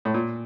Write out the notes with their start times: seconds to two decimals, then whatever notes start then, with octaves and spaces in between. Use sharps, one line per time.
0.05 A2
0.14 A#2